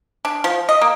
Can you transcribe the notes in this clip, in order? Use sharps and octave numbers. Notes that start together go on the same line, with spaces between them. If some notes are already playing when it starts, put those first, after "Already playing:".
D4
F3
D#5
A#3